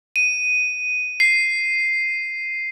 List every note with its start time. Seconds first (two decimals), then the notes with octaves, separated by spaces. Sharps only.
0.16 D#7
1.20 C7